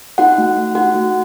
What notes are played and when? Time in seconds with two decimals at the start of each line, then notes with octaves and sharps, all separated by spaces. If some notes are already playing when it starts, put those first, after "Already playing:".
0.18 D#4 F#4 F#5
0.38 A3
0.57 A3
0.75 D#4 F#4 F#5
0.94 A3